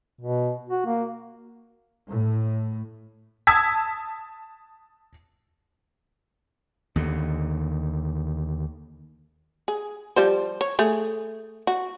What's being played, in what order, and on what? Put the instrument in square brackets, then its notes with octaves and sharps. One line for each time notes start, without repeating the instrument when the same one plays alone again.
[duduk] B2
F#4
A#3
[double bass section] A2
[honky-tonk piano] A5 D#6 E6 G#6 B6
[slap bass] D#2 D3
[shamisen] G#4
F3 G3 C5
C#5
A3 G#4
F#4